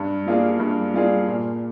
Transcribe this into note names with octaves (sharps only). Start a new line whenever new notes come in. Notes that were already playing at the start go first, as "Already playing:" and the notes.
Already playing: G2
G3 A#3 F4 G#4
G2
G3 A#3 F4 G#4
A#2